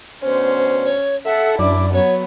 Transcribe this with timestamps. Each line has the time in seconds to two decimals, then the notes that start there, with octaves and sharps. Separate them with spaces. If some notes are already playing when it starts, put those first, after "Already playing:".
0.23 D2 B3 C#4 C5
0.84 C#5
1.26 A4 E5 F#5
1.59 F#2 D4 E4 D5 D6
1.93 F#3 B3 C#5